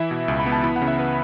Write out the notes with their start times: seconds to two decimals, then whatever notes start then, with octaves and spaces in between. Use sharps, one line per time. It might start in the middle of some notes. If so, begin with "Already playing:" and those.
Already playing: E3 E4 E5
0.11 B2
0.28 C#2
0.40 B5
0.46 B3
0.52 A5
0.64 E4 B5
0.76 F#5
0.81 C#3
0.87 E5
0.99 B4